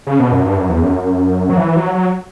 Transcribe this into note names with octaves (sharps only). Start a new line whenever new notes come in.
C#3
B2
F#2
G2
F#2
E2
F#2
F#3
E3
F#3
F#3